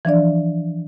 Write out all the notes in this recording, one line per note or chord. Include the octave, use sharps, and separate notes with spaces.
E3 F3 D4 D5